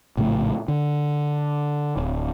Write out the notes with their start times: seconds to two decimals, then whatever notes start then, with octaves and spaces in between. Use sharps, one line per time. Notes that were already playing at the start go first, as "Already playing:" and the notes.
0.17 A#1 A2 C#3 A3
0.68 D3
1.97 D1